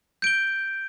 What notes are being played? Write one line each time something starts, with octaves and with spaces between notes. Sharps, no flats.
G6 D7 G7